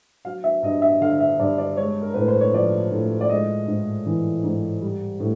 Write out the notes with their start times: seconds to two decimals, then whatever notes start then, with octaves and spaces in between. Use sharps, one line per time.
0.25 F#3 F5
0.44 E5
0.63 G2 D#5
0.82 E5
1.01 D3 F5
1.20 E5
1.40 G2 D5
1.58 D5
1.77 G#3 C#5
2.02 A#4
2.14 A2 B4
2.28 C5
2.41 C#5
2.54 F3 D5
2.91 A2
3.21 D5
3.29 G#3 D#5
3.67 G#2
4.06 E3
4.44 G#2
4.82 G3
5.20 A2